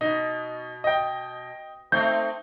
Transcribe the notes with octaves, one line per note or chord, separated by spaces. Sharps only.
B2 D#4
D#5 G5
A3 C4 D#4 G6